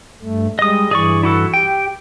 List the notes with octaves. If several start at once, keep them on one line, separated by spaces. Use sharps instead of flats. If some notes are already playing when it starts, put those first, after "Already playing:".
G2 A3
G3 G#3 D#5 D#6
G2 E3 G#4 D5 C#6
E4 F#4 A4
G4 G5